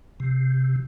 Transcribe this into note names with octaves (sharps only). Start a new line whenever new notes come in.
C3